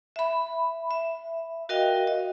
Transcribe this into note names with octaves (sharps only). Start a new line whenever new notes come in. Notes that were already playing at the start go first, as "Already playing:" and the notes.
E5 B5
E5
F#4 A#4 D#5 F5 G5
D#5